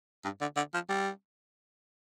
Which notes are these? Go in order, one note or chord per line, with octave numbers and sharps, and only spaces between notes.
G2
D3
D3
F3
G3